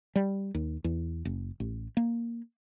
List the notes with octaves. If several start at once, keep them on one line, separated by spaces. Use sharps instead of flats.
G3
D#2
E2
F#1
A1
A#3